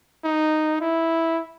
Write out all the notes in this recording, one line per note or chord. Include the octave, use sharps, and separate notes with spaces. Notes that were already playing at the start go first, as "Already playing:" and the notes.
D#4
E4